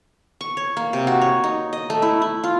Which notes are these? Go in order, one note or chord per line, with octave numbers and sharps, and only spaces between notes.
C#6
C#5
A#3
C3
F#4
C#5
D#4
D#5
A3
E4
E4
F4